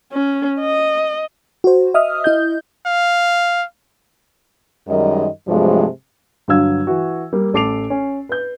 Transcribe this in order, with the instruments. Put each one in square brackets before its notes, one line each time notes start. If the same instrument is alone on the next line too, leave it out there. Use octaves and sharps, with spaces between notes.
[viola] C#4
D#5
[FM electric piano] F#4 C5
D#5 E5 D#6 F6
E4 D#5 G6
[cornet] F5
[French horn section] F#2 D#3 G3 G#3 A#4 D#5
G2 C3 F3 F#3 G#3 A3
[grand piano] G2 D3 F#3 F5 E6 G#6
E3 F#4
G3 A#3
A1 A4 D6 C7 D7 F7
C#4
B4 G6